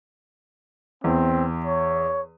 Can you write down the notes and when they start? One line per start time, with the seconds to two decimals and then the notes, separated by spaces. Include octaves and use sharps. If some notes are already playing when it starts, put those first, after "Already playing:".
1.04 E2 C4
1.66 C#5